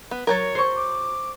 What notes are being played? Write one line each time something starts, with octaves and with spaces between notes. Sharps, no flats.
B3
F#3 A3 A#4 C#5 G#6 A6
C5 C#6
D6